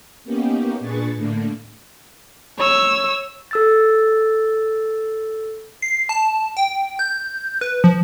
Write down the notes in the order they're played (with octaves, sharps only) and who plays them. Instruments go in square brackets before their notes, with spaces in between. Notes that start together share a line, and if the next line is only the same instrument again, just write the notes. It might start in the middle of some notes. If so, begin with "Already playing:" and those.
[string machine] A#3 B3 C#4 D#4 G4
A#2 D4 G#4 B4 C#6 A6
A2 D3 A3 A#3 D4
[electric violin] C#5 E6
[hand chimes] A4 E6 A6
[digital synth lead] C7
A5
G5
G6
B4
F3